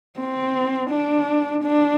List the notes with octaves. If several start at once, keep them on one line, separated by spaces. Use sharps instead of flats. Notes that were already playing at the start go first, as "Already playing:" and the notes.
C4
D4
D4